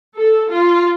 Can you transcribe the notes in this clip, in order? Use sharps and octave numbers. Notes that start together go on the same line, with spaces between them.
A4
F4